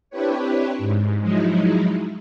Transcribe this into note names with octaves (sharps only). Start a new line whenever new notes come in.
C4 D4 E4 G4 B4 C#5
G#2
F3 F#3 G#3 D#4 E4